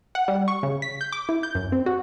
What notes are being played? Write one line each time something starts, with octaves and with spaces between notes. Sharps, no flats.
F#5
G3
C#6
C#3
B6
G6
D6
E4
G6
F#2
C4
F#4